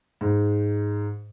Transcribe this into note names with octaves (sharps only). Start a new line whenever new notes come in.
G#2